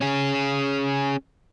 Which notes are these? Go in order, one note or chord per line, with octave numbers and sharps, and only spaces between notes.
C#4 G#4